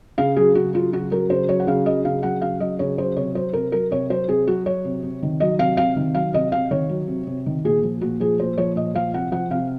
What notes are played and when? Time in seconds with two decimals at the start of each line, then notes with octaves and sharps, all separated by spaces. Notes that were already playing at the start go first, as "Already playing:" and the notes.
0.18 C#3 F5
0.36 F#3 G#4
0.55 C#3 F#4
0.74 F#3 F4
0.92 C#3 F#4
1.11 F#3 A#4
1.30 C#3 C5
1.48 F#3 C#5
1.59 F#5
1.67 C#3 F5
1.86 F#3 D#5
2.05 C#3 F5
2.23 F#3 F#5
2.41 C#3 F5
2.60 F#3 D#5
2.79 C#3 C#5
2.98 F#3 C5
3.16 C3 C#5
3.35 F#3 C5
3.53 C3 A#4
3.72 F#3 A#4
3.91 C3 C#5
4.10 F#3 C5
4.28 C3 G#4
4.47 F#3 F#4
4.66 F#3 C#5
4.85 C3
5.03 C3
5.22 D#3
5.40 F#3 D#5
5.59 C3 F5
5.77 C3 F5
5.96 D#3
6.15 F#3 F5
6.33 C3 D#5
6.52 C3 F5
6.71 D#3 C#5
6.89 F#3
7.08 C3
7.27 C3
7.46 D#3
7.65 A#2 G#4
7.83 F3
8.01 A#2 F#4
8.20 F3 G#4
8.39 A#2 C5
8.58 F3 C#5
8.76 A#2 D#5
8.95 F3 F5
9.14 C3 F#5
9.32 F3 F#5
9.50 C3 F5